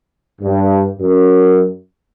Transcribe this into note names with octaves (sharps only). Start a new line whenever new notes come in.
G2
F#2